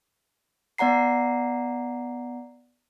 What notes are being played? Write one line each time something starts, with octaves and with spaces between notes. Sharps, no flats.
B3 D5 F#5 A#5 C7